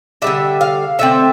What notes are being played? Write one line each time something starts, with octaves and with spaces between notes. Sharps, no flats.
D3 G3 D4 E5
F5
D3 A3 C4 E5